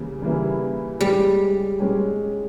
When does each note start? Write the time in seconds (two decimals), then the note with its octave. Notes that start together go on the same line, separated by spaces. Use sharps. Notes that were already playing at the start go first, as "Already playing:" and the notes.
Already playing: C#3 E3 G3 A#3
0.22 C#3 E3 G3 A#3 E4
1.01 G3 G#3 C#4 G4
1.79 G#3 C#4 G4